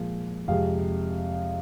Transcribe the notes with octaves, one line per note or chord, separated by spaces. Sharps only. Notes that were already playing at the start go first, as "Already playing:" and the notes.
Already playing: A#2 F3 G#3
F2 C3 G#3 F5